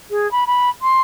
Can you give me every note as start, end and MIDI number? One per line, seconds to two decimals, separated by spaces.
0.10 0.30 68
0.31 0.44 83
0.47 0.69 83
0.82 1.02 84